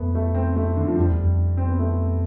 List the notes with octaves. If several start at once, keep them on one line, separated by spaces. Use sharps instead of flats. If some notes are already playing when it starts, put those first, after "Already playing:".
Already playing: F2 A3 B3
A3
C4
A3
D3
F3
F2 G3
E2
F2
C4
B3
A3